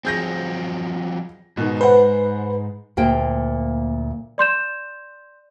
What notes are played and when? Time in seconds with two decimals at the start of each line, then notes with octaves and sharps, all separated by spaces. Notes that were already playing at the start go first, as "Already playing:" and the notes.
0.05 F3 F#3 C4 G#4 G6 A#6
1.57 G#2 B2 D#3
1.81 B4 C5 F#5
2.97 D2 A#2 A#3 G5
4.38 D5 C6 G6 E7